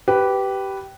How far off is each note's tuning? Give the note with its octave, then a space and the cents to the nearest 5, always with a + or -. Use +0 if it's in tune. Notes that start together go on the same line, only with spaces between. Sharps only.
G4 -15 B4 +0